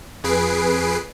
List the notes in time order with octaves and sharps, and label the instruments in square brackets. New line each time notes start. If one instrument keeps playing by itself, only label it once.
[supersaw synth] F2 G#4 B4 C7 D7